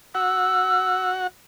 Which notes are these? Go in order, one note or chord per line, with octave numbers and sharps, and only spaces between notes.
F#4 F#5 E6